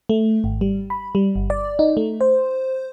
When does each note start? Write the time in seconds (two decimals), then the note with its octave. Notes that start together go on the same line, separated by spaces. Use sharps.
0.09 A3
0.44 G#1
0.61 G3
0.90 B5
1.15 G3
1.36 G1
1.50 D5
1.79 D#4
1.97 A3
2.21 C5